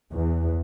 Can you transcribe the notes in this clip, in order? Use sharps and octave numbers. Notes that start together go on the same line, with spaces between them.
E2